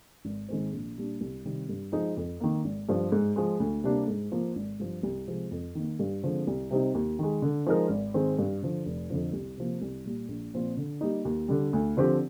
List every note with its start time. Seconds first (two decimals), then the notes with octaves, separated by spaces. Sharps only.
0.25 G#1
0.48 G#2 D#3 G#3 C4
0.73 A#1
0.96 A#2 G3 D4
1.21 C2
1.45 C3 D#3 G3
1.69 G2
1.92 F3 G#3 D#4 G#4
2.17 F2
2.40 D#3 A#3
2.65 G#1
2.89 G2 F3
3.12 G#2
3.36 F3 G#3
3.60 D2
3.84 C3 G3 A#3 D4
4.08 G#2
4.32 F3 A#3 F4
4.56 G#1
4.79 G2 F3
5.03 C2
5.28 C3 F3 G#3
5.51 F2
5.75 D#3 A#3
5.99 G2
6.23 D3 F3 G#3 C4
6.47 C2
6.70 C3 G3 C4 D#4
6.94 D#2
7.19 D#3 G#3
7.42 D3
7.66 F3 G#3 D#4 A#4
7.89 G#1
8.14 G#2 D#3 G#3 C4
8.39 G2
8.62 D3 F3
8.86 F1
9.10 F2 D3 F3
9.33 C2
9.57 C3 F3 A#3
9.82 C2
10.05 A#2 G3
10.29 A#1
10.54 A#2 F3 C4 F4
10.77 D3
11.01 G3 A#3 D#4
11.25 D#2
11.48 D3 G3
11.73 D2
11.97 D3 F3 C4 G4